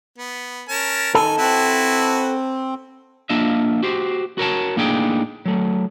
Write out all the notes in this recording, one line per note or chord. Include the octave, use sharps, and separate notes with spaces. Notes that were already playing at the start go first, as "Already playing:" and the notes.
B3
C#4 A#4 A5
D#3 A4 G#5
C4 E4 F#4 B4
A#3 D4 F4 D#5 E5
F#4 G4 C5
F#4 A#4 C#5 A5
A2 A#3 D4 D#4 G#4 G5
F#3 A3